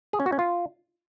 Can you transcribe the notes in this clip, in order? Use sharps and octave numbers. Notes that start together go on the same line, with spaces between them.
G#4
C#4
F#4
C#4
F4